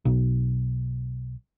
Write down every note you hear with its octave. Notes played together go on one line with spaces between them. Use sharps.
B1